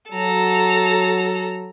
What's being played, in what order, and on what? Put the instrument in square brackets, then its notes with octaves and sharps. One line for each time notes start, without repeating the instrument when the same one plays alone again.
[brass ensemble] F#3 [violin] A4 A#5